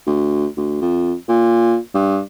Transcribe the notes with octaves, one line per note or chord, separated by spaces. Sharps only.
D2
D2
F2
A#2
G2